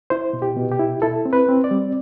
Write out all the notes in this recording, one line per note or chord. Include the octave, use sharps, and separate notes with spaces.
E4 C5
B2
G4
B2
G4
E4
E4 A4
C4
B4
C4
D5
G3